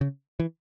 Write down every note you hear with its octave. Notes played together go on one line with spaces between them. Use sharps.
C#3
E3